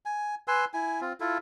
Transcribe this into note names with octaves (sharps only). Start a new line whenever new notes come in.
G#5
B4 G#5 C6 E6
E4 G#5
C4 F4
E4 F4 A4